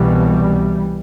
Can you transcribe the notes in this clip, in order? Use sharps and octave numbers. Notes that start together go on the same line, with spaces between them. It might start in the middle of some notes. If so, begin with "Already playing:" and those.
Already playing: C2 B2 E3 G3